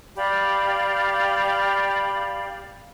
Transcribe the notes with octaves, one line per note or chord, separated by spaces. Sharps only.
G4 D5 F5 B5